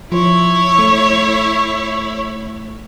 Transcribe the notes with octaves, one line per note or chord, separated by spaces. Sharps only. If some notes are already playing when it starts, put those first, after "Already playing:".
F3 E4 C#5
A3